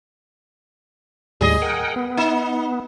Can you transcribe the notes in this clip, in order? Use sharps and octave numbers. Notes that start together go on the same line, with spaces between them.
D#2 A2 G3 G#4 D#5
A#4 F#5 G5
B3
D#4